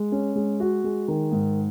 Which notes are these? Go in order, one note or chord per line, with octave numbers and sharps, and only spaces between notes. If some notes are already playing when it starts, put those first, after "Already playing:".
Already playing: G#3
C#4
G#3
F#4
G#3
D#3
G#2